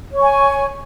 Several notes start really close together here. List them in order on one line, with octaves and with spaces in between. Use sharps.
C#5 C#6 G#5